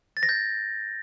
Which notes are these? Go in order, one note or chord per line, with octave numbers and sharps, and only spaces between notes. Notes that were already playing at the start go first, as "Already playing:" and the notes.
A6
A#6
G6